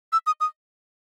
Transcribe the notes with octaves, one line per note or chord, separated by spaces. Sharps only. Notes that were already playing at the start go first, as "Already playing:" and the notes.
E6
D#6
D#6